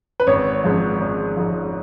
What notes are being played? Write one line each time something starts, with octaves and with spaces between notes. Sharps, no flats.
B4
G#1 C#5
G#2 F3
G#1
G#2 F3